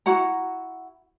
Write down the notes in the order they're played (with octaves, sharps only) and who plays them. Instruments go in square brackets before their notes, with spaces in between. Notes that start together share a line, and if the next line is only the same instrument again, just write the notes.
[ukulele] E4 F#4 F#5 A#5